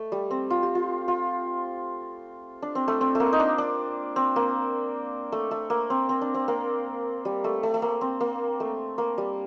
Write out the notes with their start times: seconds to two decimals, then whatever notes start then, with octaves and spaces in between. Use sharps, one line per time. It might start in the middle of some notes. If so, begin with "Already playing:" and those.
Already playing: A3
0.12 G3
0.30 C4
0.50 F4
0.63 G4
0.75 F4
1.08 F4
2.62 D4
2.75 C4
2.88 A3
3.01 C4
3.15 A3 A#3
3.33 D#4
3.39 D4
3.58 D4
4.16 C4
4.36 A#3
5.32 A3
5.51 A3
5.70 A#3
5.90 C4
6.09 C4
6.21 D4
6.34 C4
6.48 A#3
7.25 G3
7.44 A3
7.63 A3
7.74 A3
7.82 A#3
8.01 C4
8.20 A#3
8.60 A3
8.98 A#3
9.18 G3